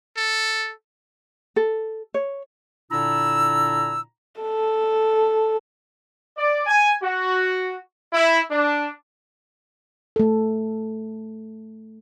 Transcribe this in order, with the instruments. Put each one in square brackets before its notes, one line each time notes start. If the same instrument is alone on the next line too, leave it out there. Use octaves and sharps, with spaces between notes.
[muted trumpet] A4
[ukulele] A4
C#5
[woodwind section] A#2 D3 D4 E4 A#5 E6
[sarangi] A4
[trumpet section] D5
G#5
F#4
E4
D4
[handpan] A3 A4